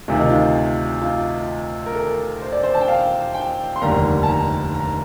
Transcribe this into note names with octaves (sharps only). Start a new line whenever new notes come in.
D2 C3 D#3 F4
D#4
F4
F4
A#4
A4
C5
D5
C5
A5
G5
F5
G5
C6
F1 D#2 D3 G3 A#5
A5
A#5
A#5